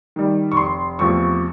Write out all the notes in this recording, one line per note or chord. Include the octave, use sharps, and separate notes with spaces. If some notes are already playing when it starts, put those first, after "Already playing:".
D#3 G3
C#6
F1 C6
E2 C3 F3 A3 C#6